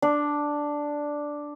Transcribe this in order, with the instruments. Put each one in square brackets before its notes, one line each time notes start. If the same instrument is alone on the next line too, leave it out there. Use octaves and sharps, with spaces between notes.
[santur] D4